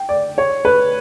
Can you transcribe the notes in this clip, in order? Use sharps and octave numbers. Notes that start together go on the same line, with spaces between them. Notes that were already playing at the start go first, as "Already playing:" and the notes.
Already playing: G5
D5
C#5
B4